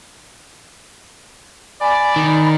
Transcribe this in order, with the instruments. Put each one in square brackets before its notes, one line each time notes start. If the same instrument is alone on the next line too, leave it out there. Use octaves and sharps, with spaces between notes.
[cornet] D5 [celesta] G#5 [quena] B5
[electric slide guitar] D#3